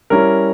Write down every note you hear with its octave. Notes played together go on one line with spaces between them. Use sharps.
G3 C#4 E4 A#4